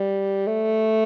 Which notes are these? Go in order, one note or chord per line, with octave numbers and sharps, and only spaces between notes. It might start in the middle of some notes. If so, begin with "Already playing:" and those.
Already playing: G3
A3